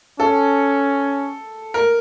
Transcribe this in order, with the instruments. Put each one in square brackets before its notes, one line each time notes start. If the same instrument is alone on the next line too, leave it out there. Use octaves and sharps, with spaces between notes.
[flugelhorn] C#4 [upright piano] A4
[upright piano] A#4